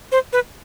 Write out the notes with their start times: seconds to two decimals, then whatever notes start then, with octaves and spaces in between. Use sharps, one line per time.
0.12 C5
0.33 B4